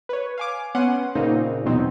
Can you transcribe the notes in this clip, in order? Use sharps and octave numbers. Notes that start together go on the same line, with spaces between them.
B4 C#5
F5 G#5 D6
B3 C#4 F#5 C6 D#7
A#2 C#3 C4 D#4
E2 B2 F#3 B3 C4 D#4